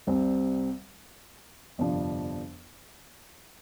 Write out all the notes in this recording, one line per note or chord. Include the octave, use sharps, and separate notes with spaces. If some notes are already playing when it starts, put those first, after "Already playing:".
C2 C3 G3 C4 G4
G1 F2 C3 F3 D4